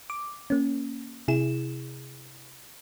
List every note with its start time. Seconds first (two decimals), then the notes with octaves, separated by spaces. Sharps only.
0.10 D6
0.50 A#3 C#4
1.28 C3 E4 G#4 E7